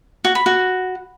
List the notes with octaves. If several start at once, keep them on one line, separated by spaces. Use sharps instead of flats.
F#4
B5
F#4